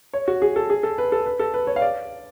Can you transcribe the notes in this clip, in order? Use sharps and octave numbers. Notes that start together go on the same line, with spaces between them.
C#5
F#4
G#4
A4
G#4
A4
B4
A4
B4
A4
B4
C#5
F5
D5